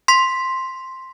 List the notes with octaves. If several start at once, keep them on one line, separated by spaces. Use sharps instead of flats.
C6 B6